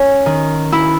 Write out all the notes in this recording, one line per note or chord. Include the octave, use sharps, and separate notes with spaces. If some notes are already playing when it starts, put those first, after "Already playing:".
Already playing: C#4
D#3
E4